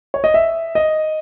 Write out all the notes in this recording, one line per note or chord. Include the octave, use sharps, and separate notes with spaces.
C#5
D#5
E5
D#5